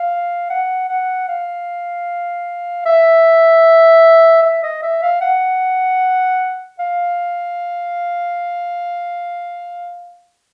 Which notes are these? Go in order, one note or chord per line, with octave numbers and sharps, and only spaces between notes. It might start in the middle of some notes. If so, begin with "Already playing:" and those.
Already playing: F5
F#5
F#5
F5
E5
E5
D#5
E5
F5
F#5
F5